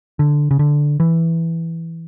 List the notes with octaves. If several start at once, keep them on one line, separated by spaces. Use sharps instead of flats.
D3
C#3
D3
E3